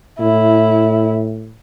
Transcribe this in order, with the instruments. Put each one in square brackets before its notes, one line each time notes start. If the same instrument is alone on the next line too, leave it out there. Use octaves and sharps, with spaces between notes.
[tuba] A2 [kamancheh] E4